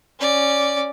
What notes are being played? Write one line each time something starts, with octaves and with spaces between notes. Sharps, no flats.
C#4 D5